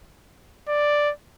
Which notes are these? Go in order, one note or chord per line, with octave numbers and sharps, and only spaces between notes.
D5